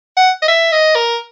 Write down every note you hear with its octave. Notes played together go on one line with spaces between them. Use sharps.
F#5
D#5
E5
D#5
A#4